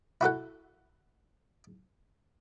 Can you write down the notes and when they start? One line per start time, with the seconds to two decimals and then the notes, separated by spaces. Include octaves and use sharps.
0.21 E4 F#4 A4 F#5